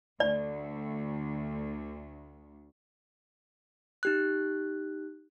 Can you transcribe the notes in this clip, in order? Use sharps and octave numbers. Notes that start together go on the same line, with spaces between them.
D2 D5
D#4 G4 F#6